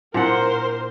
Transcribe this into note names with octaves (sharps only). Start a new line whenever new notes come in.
A#2 D4 E4 A#4 C5 F#5